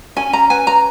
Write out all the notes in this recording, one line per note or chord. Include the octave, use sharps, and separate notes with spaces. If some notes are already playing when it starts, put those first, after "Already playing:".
C#4 G#5
A#5
B4 G#5
A#5